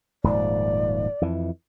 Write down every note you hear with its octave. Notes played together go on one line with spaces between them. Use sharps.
D#1 G#2 F3 D5
F2 E3